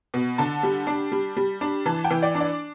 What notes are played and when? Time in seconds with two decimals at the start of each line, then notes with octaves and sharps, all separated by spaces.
0.14 B2
0.38 D3 A5
0.63 G3
0.87 D4
1.12 G3
1.37 G3
1.61 D4
1.86 E3 A5
2.04 G5
2.11 E3
2.22 D5
2.35 D4
2.40 D5